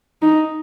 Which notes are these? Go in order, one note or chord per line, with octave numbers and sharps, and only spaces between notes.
D#4